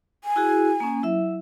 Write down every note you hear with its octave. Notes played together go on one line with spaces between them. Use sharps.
G#5
E4 F#4 G#4
A#3 C#4
F#3 E4 E5